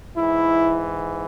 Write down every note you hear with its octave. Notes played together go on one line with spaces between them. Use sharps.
G#2 E3 E4